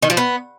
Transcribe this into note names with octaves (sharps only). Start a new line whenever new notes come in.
D#3
F3
B3